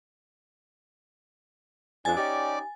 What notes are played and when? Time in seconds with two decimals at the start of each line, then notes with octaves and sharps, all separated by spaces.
2.05 F2 D4 G#5 A6
2.17 C#4 D#4 G4 D5